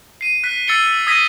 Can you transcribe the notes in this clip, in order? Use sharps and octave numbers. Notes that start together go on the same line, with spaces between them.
C7 D#7
F#6 B6
E6 A6 C7 C#7 G7
E6
D#6 E6 G#6 A#6 B6 D#7